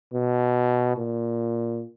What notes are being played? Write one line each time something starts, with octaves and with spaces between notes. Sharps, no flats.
B2
A#2